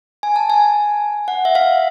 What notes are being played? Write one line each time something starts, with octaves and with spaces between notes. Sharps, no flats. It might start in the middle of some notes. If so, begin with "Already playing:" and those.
G#5
A5
G#5
F#5
E5
F5